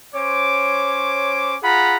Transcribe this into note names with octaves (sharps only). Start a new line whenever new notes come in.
C#4 C5 C#5 D6
F4 G#4 F#5 A#5 B5